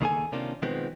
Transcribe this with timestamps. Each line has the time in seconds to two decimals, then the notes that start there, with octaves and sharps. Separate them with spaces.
0.01 C#2 D#3 A#3 G#4 A4 G#5
0.32 C3 D#3 A#3 C#4 D4 F4
0.62 B2 D#3 F3 G#3 B3 C4